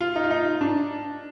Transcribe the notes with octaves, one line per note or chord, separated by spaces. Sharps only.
F4
D#4
F4
D#4
D4